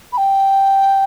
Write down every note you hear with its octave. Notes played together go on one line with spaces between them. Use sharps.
B5
G5